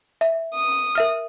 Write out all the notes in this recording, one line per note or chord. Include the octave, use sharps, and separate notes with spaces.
E5
D#6
A#4 E5 F6